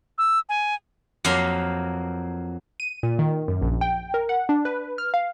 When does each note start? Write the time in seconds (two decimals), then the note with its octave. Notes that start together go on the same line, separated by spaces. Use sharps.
0.18 E6
0.49 G#5
1.25 F2 F#3 A#3 F5 C6
2.80 D#7
3.03 A#2
3.19 D#3
3.48 F#2
3.62 A#1
3.81 G5
4.14 A#4
4.29 F#5
4.49 D4
4.65 B4
4.98 F6
5.14 F5